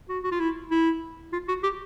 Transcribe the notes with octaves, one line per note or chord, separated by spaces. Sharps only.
F#4
F#4
F4
E4
E4
F4
F#4
G4